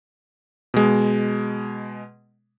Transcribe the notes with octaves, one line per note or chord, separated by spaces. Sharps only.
B2 G#3